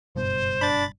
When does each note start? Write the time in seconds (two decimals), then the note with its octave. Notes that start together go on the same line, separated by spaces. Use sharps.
0.16 F#1 G2 B2 C5
0.61 D4 B5 A6